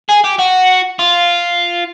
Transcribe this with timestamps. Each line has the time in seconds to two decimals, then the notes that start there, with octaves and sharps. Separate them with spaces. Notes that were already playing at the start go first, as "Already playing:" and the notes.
0.09 G#4
0.24 G4
0.39 F#4
0.99 F4